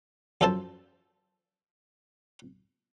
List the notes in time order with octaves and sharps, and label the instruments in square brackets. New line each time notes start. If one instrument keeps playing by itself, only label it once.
[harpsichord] F#2 F3 A4 C5 A5